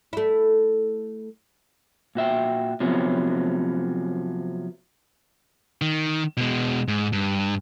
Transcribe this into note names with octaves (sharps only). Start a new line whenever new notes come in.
A3 E4
A#2 F#4 E5 G5
C3 F3 F#3 A3 B3 C#4
D#3
B2 G#3
G#2
G2